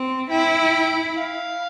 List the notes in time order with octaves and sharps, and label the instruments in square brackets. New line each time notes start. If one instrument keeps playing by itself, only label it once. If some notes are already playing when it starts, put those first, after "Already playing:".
Already playing: [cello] C4
[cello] E4 [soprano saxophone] G5
[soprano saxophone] F5